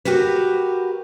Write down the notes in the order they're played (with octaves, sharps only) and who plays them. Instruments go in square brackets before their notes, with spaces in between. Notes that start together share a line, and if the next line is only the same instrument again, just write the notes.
[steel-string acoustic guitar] F#4 G4 A#4 B4